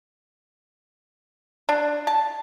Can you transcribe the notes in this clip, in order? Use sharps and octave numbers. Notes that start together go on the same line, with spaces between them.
D4
A5